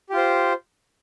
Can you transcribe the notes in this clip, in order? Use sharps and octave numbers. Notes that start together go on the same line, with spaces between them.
F4 G4 C5